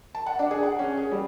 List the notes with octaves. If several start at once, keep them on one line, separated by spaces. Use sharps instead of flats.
A5
F#5
D4
G#4
F#5
C#4
G#4
G3